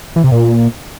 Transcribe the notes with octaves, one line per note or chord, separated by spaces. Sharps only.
E3
C3
A#2